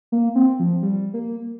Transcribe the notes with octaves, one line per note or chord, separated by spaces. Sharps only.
A#3
C4
F3
G3
A#3